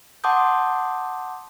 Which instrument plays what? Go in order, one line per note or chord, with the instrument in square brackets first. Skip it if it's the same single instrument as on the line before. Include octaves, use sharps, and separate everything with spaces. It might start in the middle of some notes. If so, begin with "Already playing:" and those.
[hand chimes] F#5 A5 C6 D6 D#6 G6